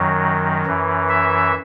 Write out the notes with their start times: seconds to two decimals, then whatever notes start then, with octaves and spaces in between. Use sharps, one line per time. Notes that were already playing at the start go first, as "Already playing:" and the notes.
Already playing: F#2 D#3 F#3
0.66 F#2 E3
1.09 E5